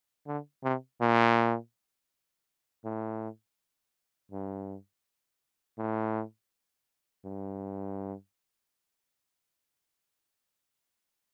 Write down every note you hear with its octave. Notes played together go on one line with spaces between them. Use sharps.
D3
C3
A#2
A2
G2
A2
G2